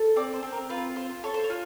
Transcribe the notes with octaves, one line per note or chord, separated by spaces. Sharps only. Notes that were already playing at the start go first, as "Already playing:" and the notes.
Already playing: A4
C4 D5
C5
C4
A#4
F4 B4
F4 C5
A4 C#5
C5
C#5
F4